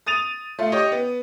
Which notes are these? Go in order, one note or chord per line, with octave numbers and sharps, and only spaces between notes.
D#6 A6 D#7 F7
A3 F4
G4 C#5 D#5
B3